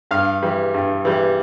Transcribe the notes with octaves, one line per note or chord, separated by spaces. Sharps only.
G2 F5
E3 G3
G2
E3 G3